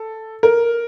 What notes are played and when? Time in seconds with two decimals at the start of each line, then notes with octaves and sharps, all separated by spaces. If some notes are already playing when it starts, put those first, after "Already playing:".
Already playing: A4
0.43 A#4